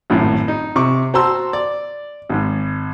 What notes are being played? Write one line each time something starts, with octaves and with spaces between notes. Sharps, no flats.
G#1 F#2 A2
D#4
C3 C#6 D6
F#4 C5 A5 A#5 C6 E6
D5
G#1 G#2